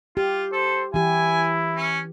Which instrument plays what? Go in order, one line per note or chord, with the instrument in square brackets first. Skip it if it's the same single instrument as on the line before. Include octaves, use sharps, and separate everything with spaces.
[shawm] F4 [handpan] G4
[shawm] A4 [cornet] C5
[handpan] E3 G4 [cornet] E4 [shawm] G#5
[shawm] C#4